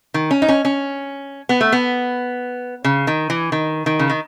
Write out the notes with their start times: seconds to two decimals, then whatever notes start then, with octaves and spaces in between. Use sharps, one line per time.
0.14 D#3
0.31 C#4
0.42 D#4
0.49 C#4
0.65 C#4
1.49 B3
1.61 A3
1.72 B3
2.84 C#3
3.07 D#3
3.30 E3
3.52 D#3
3.86 D#3
3.99 C#3
4.10 D#3